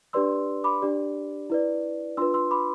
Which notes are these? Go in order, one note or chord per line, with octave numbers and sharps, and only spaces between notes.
D4 G4 B4 D5 C6 E6
B5 D6
D4 G4 D5
E4 B4 D5
D4 F4 B4 C6 E6
C6 E6
B5 D6